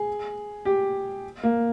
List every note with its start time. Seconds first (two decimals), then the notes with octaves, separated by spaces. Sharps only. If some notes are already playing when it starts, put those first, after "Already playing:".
Already playing: G#4
0.65 G4
1.43 A#3